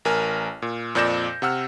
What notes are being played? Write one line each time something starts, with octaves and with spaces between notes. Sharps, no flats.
A1 A#4 G#5 F6
A#2
F2 A#2 D5 G6 A#6 E7
C3 F#5 E6 F6